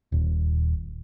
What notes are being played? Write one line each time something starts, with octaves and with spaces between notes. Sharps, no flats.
D#1